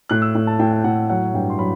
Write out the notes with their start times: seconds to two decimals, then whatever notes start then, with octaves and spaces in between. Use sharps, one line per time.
0.09 A2 F#6
0.22 E6
0.35 A2
0.47 A5
0.59 A2 G5
0.73 G5
0.84 A2 F#5
1.10 F#3 F#5
1.34 G2 G5
1.50 C6
1.59 F#3 B5